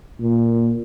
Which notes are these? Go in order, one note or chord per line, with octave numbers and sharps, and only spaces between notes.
A#2